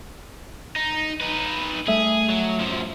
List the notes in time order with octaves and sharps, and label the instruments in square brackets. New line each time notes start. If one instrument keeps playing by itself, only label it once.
[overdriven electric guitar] D#4
D#4 B4
[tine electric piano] G3 A3 E5 [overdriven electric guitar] G#4
[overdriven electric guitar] F#3
F#2 F3